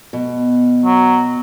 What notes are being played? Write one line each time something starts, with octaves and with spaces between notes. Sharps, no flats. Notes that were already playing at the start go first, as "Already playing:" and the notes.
B2
F#3